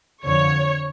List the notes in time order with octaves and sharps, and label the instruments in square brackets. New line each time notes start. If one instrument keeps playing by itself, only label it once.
[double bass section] F2 D3 F3 [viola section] C#5